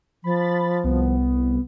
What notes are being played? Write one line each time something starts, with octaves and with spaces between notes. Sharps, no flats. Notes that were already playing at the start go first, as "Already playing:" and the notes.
F3 B5 A6
C2 B3